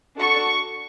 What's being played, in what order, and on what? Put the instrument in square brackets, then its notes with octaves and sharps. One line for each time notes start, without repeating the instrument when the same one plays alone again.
[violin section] D4 F#4 A4 C#6